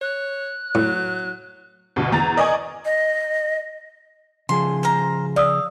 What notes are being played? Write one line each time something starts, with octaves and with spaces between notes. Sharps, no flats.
C#5 F#6
A2 F#3
D2 G2 B2
E2 A#5 A6
A#4 D5 D#5 G#5 C#6 G#6
D#5
C#3 F3 G#4 C6
C5 F5 A#5
D5 F5 D#6 E6